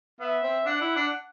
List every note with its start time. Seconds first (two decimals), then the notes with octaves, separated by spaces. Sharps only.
0.20 B3 E5
0.43 C4
0.66 D4 F#5
0.81 E4
0.96 D4